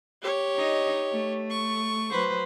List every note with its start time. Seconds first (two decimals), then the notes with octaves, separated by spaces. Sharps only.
0.22 G4 C#5
0.56 D#4 D#5
1.12 A3
1.50 C#6
2.10 F#3 B4 C5